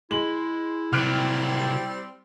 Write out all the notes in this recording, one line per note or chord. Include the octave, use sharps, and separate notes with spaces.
G#3 E4 F#7
C3 F#3 G3 C4 F6 F#6 D7